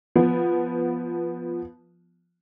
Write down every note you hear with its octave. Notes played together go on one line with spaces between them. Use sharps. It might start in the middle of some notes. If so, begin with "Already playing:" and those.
F3 B3